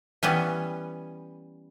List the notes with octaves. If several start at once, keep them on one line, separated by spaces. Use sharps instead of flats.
E3 G3 B3 C#4